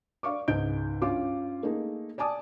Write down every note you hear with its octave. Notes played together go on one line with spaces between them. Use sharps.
D5 F5 C#6 D6
C#2 G#2 D#5 G6 D7
G2 C#4 F4 D6
A3 A#3 D#4 G#4
D5 G#5 A5 D6 D#6